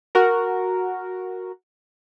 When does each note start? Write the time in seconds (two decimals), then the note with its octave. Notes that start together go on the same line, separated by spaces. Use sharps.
0.15 F#4 A#4